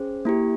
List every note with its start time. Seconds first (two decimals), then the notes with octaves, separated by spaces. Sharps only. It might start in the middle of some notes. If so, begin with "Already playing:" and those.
Already playing: C#4 G#4 C5
0.25 A#3 E4 G4